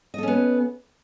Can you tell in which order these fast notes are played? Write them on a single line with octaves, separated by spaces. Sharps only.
D#5 A4 C#4 B3